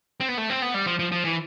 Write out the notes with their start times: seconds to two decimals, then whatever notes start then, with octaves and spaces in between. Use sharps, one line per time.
0.20 C4
0.29 B3
0.38 A3
0.50 C4
0.62 B3
0.74 G3
0.86 F3
0.99 F3
1.12 F3
1.24 E3